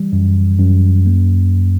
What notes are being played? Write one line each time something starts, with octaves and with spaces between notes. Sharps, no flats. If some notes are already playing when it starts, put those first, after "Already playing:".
Already playing: E3 G3
F#2
F#2
A#3